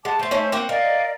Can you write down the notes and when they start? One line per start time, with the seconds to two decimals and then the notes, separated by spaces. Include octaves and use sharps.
0.05 G#3 F#5 A5 D6
0.19 A3 C5 A5
0.31 A3 C#4 D#4
0.52 A#3 C4 F#4
0.69 A#4 D5 D#5 F5